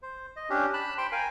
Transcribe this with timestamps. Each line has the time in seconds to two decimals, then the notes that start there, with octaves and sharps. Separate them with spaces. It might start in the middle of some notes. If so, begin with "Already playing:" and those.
0.02 C5
0.36 D#5
0.50 C#4 D4 G4
0.74 A5 B5 F#6
0.98 C5 G5 B5 C6
1.12 A#4 F5 G5 G#5